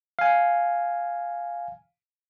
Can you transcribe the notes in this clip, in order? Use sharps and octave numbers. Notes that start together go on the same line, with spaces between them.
F5 G#5